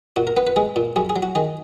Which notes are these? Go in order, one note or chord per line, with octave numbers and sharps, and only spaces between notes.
A#2 F#4
A#4
B3 B4
B4
G#3 G#4
A#2
F#2 G#4
G#4
F#3
F#4
D#3 G#4